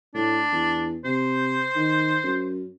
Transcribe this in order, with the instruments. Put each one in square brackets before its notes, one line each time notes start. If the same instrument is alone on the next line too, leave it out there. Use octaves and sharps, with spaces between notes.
[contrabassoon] A2 [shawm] D4
[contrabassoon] E2
[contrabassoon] C3 [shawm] C5
[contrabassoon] D#3
F#2